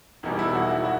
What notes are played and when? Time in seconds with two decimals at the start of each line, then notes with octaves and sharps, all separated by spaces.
0.23 E1 E2 B2 G3 D#4
0.39 E4
0.54 F#4
0.85 F#4